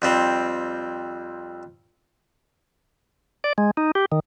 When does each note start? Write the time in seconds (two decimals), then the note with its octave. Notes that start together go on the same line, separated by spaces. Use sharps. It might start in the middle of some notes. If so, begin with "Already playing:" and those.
0.02 F2 G3 C4
3.44 D5
3.58 G#3
3.77 D#4
3.95 G4
4.12 D#3